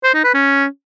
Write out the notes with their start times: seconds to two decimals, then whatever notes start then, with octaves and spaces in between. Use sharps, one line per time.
0.04 C5
0.14 D#4
0.24 B4
0.34 C#4